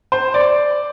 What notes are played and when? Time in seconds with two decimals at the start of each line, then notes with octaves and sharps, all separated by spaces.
0.12 C5
0.34 D5